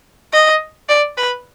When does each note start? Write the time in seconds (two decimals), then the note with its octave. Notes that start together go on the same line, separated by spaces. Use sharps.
0.33 D#5
0.89 D5
1.17 B4